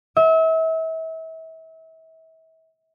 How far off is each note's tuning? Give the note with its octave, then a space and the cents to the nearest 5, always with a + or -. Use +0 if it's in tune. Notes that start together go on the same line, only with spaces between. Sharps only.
E5 -35